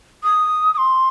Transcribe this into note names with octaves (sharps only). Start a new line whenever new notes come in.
D#6
D#6
C6